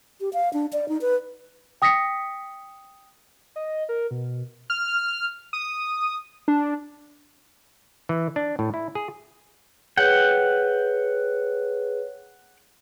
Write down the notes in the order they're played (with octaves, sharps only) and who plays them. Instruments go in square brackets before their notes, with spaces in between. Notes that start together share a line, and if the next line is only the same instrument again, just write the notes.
[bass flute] G4
F5
D4
D5
D#4
B4
[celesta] G5 D#6 A#6 B6 C#7
[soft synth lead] D#5
A#4
B2
[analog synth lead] F6
D#6
D4
[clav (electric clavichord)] E3
D4
A2
E4
G#4
[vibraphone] G#4 B4 C#5 [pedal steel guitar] F#5 G5